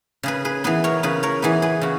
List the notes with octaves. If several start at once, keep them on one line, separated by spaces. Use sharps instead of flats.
C#3 G#4 B4
G#4 B4
E3 B3 G#4 B4
A#4 C#5
C#3 G#4 B4
A#4 C#5
E3 B3 G#4 B4
G#4 B4
C#3 F#4